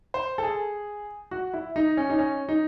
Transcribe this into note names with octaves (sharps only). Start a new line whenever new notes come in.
C5
A4
G#4
F#4
E4
D#4
C#4
D#4
C#4
D#4